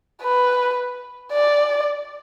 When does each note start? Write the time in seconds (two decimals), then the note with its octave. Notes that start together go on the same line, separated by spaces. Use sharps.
0.23 B4
1.32 D5